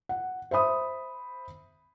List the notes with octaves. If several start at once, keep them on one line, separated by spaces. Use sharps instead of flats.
F#5
C5 E5 B5 D#6